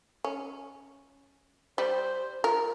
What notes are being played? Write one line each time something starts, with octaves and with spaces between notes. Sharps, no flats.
C#4
G3 C5
F4 A#4